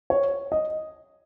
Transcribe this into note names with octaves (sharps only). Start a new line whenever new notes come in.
C#5
D#5